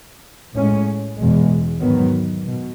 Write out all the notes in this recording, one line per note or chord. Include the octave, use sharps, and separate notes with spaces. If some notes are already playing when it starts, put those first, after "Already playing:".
A2 G#3 C#4
E2 B2 G#3
G#2 D#3 F#3 B3
B2